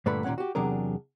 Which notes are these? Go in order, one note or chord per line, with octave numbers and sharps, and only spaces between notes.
G2 A#2 D3 A3 B4 B5
D#2 A#2 G#3 C#4 F#5
F#4 G4
E2 C3 F#3 D4 G#4 A#4